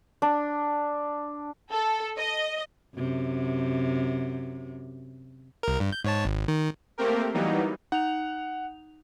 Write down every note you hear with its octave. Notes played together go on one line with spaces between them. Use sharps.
D4
A4
D#5
F#2 C3
C2 A#4
G2
G6
G#2 C#5 A5
G#1
D#3
A3 A#3 C4 G4 A#4
E3 F#3 G3 A#3 B3 D#4
D#4 F#5 F7